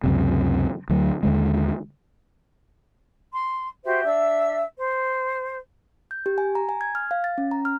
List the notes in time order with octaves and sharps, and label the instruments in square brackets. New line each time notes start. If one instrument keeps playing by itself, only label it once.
[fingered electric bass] C#2 F#2 C3
D2 F#3
D#2 D3 G#3
[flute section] C6
F#4 G4 C5 E5
D4 E5 E6
C5
[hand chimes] G6
G4
G#5
A#5
G#5
G#6
F6
F5
A6
C#4
A#5
F6